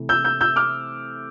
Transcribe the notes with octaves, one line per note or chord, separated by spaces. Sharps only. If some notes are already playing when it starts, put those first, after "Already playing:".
Already playing: C3 E3 A3
E6 G6
E6 G6
E6 G6
D6 F6